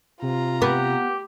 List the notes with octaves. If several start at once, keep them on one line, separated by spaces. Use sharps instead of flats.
C3 F4 A#5
B3 G4